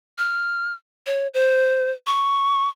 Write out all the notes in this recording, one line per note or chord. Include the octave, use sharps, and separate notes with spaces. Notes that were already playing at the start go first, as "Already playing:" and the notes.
F6
C#5
C5
C#6